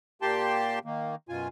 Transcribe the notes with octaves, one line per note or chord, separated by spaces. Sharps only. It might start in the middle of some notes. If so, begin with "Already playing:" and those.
A#2 A#3 G4 G5 A5 C6
D#3 A#3
F#2 B2 F4 G#5